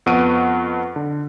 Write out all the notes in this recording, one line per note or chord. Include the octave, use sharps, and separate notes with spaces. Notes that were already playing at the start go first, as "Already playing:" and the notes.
F2 B3 F#5 C#6 D7 D#7
D3